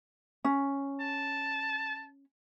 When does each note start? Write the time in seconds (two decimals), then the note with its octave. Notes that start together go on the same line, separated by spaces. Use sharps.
0.45 C#4
1.00 A5